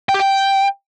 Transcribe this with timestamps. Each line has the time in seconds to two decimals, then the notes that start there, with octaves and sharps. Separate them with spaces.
0.09 G5
0.14 G4
0.20 G5